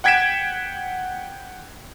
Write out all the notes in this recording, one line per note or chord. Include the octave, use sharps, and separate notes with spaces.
F#5 G5 G#6 B6 D7 E7